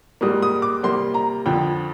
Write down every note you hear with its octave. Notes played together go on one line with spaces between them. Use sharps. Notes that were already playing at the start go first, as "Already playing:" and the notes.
G#2 G3 A#3 D#6
D#6
D6
C3 G3 A#3 C6
A#5
F2 D3 F3 G5